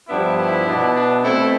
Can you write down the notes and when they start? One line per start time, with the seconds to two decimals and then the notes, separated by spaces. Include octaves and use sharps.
0.08 G2 F3 B3 D4 E4
0.38 E4
0.66 B2 B3 D4
0.94 D4
1.23 B2 A3 C4 E4